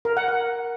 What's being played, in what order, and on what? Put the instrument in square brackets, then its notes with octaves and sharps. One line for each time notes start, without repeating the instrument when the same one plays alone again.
[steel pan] A#4
F#5
F#5